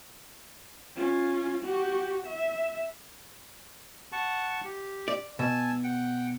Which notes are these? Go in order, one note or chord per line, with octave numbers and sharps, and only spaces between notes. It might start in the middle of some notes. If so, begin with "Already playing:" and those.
C#4 F4
F#4 G4
E5
F#5 A5 C#6
G4
D5
B2 G#5 A5 E6
F#5 G5